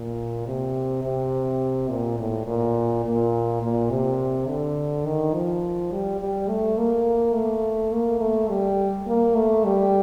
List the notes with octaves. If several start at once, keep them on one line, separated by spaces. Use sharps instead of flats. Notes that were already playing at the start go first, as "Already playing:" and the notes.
Already playing: A#2
C3
C3
A#2
A2
A#2
A#2
A#2
C3
D3
D#3
F3
G3
G3
A3
A#3
A3
A#3
A3
G3
A#3
A3
G3